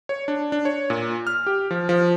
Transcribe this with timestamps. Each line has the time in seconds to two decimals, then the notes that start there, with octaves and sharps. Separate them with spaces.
0.09 C#5
0.28 D4
0.52 D4
0.65 C#5
0.90 A#2
1.27 F6
1.47 G4
1.71 F3
1.89 F3